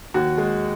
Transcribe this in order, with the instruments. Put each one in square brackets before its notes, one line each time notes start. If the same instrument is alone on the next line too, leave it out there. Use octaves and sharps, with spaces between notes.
[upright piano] D#2 F#4
G#3